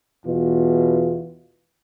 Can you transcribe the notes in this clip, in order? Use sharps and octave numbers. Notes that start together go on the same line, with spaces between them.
E2 B2 E3 F4